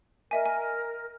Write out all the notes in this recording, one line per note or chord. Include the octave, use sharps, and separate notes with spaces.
A#4 D#5 E5 G#5
G#5